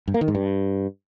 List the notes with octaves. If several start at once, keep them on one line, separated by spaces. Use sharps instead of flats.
G2
A#3
D#3
G#2
G2